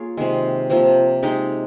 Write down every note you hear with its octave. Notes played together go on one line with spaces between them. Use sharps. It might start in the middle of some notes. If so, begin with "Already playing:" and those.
Already playing: A#3 F4 G#4 C#5
C3 D#3 G#3
C3 F3 A#3
G#3 D#4 G4